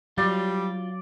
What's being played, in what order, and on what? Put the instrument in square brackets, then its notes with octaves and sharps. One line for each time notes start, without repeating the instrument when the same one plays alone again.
[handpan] F#3 [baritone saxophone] G3 [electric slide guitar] F4 [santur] D5